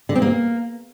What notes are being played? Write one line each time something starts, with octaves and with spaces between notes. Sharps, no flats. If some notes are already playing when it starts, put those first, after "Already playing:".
D3
C4
A#3